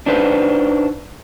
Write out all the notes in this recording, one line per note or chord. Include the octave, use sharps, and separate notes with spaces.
D4 D#4 B4 C5